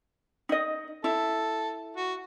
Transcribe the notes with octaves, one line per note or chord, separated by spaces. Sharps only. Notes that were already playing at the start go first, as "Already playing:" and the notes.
D#4 D#5
E4 A4
F#4